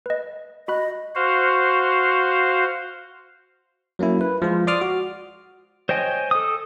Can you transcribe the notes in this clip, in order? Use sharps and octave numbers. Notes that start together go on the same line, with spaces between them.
B4 D#5
F#4 D#5 B5 F#6
F#4 C5 F5
F#3 A#3 C#4 E4
B4
F3 G#3 F4
D5 C6 D6 D#6 F6
F#4
C5 C#5 D#5 G5 G#5
A4 D#6